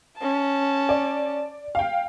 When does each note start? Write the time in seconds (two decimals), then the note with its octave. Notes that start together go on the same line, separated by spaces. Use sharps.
0.18 C#4 A5
0.89 D5
1.75 F5 G5